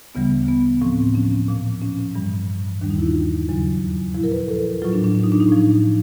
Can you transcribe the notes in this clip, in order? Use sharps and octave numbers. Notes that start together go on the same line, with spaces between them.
D2 C#3 E3 G3 B3
B3
A2 F3 C4
C#4
A#2 F3
C#4
G2 E3 G3
D#2 D#3 G3 D4
D#4
E4
F4
E2 C#3 F#3
A#2 F3 E4
A#4
B4
A#4
A4
A2 F#3 F4
D4
D4
D4
D#4
D4
D#4
A2 F3